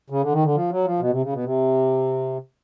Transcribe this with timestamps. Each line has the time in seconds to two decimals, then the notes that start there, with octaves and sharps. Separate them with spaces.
0.10 C#3
0.22 D3
0.32 D#3
0.44 D3
0.54 F3
0.70 F#3
0.85 F3
0.99 B2
1.10 C3
1.22 C#3
1.33 B2
1.44 C3